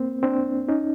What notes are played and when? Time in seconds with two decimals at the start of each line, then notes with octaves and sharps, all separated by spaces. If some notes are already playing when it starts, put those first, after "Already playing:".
Already playing: A#3 C4
0.23 C4 D4
0.69 C#4 D#4